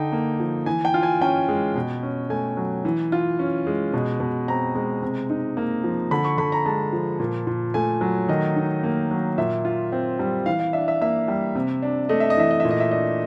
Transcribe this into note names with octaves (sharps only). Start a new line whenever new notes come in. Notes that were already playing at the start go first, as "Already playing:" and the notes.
Already playing: D3 D#4 G5
A#3
F3
E3 G#5
G5
F4
G#5
C#4 G5
G#3
B2
C#4
A3 G#5
F#3
E3
F4
C#4
G#3
B2
B2
C4 A#5
G#3
C3
D#4
A#3
F3
D3 B5
C#6
D3 B5
A#5
G#3 A5
F3
A#2
A#2
A3 G#5
F#3
D#3 D#5
D#4
A#3
F#3
A#2 E5
F4
C4
G3
E3 F5
F5
D4 E5
E5
A#3 E5
G3
C3
D4
A3 D#5
E5
D#5
E3 E5
D#5
A#2 E5
D#5
E5
D4 D#5